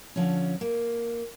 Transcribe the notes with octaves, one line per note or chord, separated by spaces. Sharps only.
D3 F3 C#4
A#3